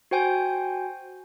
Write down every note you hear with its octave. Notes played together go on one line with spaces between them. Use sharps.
F#4 C5 G5 G#5 G6